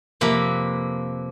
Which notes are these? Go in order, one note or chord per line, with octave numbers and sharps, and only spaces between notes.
F2 C3 A#3 B4